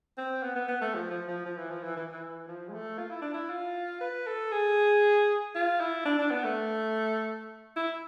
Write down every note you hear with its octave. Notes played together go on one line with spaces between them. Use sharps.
C4
B3
B3
B3
A3
F3
F3
F3
F3
E3
F3
E3
E3
E3
F3
G#3
A3
F4
E4
D4
E4
F4
B4
A4
G#4
F4
E4
D4
D4
B3
A3
E4